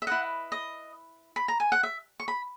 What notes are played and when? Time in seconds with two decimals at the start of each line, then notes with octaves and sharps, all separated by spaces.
0.02 E5
0.07 E4 B4 D#5 F#5
0.52 D#5
1.36 B5
1.48 A#5
1.60 G#5
1.72 F#5
1.83 E5
2.20 C#6
2.28 B5